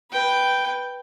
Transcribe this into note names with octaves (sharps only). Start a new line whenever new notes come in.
B4 G5